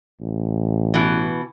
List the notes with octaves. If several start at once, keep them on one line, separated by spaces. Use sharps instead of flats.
A1
B2 E3